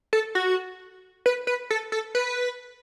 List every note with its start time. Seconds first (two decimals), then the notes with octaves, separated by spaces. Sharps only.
0.13 A4
0.35 F#4
1.26 B4
1.47 B4
1.70 A4
1.92 A4
2.15 B4